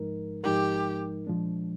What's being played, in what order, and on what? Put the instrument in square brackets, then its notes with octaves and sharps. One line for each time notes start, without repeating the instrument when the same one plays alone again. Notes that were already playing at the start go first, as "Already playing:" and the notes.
Already playing: [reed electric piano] G#2 F3 G#3 D#4 A#4
[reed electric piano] G#2 F3 G#3 D#4 A#4 [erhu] G4
[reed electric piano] A#2 F3 G#3 D4